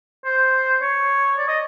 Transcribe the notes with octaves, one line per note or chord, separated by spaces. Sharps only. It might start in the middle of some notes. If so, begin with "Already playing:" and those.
C5
C#5
D5
D#5